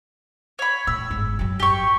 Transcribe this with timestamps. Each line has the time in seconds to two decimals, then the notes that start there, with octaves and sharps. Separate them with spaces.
0.59 C#5 B5
0.87 A2 E6
1.10 G1 G#2
1.39 F#2 F#3
1.60 G4 C#6